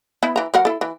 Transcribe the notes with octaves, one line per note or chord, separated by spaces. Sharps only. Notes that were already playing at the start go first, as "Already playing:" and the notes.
B3 E4
E3 A#5
F#3 A#4 F#5
E4 A4
E3